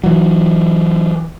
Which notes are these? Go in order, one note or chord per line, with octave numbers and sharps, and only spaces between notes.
E3 F#3